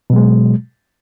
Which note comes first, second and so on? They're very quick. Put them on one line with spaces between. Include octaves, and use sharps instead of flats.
B2 F#3 G#3